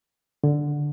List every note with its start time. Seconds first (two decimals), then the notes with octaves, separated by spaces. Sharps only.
0.44 D3